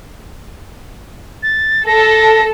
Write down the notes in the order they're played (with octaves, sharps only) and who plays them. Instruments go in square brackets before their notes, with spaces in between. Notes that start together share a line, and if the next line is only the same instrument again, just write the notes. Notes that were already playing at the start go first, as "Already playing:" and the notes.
[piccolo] A6
[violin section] A4 [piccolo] A#6